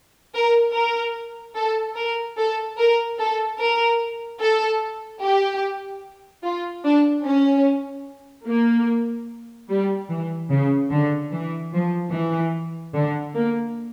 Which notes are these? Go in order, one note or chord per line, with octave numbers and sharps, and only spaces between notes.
A#4
A#4
A4
A#4
A4
A#4
A4
A#4
A4
G4
F4
D4
C#4
A#3
G3
E3
C#3
D3
E3
F3
E3
D3
A#3